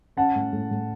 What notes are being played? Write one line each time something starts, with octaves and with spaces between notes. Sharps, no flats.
C#4 F#5 A5
A2
A2
A2